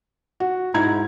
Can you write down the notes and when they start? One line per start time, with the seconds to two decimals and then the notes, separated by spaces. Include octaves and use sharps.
0.40 F#4
0.74 G#2 E4 A#5 G#6